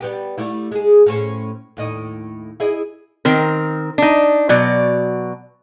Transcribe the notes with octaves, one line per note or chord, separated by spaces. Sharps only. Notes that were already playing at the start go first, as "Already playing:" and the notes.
G3 B3 G4
G3 A3 E4
G#3 G#4
A2 C#4 C5
D#2 A2 D#5
E4 G#4 D#5
D#3 C4 A#4
D4 D#4
B2 F#3 D5